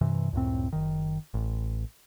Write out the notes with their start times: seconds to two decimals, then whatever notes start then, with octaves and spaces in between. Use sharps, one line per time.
0.01 G2 C3 E3
0.33 C#2 F#2 A2 C4
0.73 F#1 D#3
1.34 A1